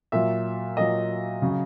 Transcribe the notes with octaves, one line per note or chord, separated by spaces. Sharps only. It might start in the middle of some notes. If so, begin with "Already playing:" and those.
A#2 F#3 E5
A#2 F#3 D#5
C#3 F#3